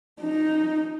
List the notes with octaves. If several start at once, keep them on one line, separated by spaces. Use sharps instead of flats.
D#4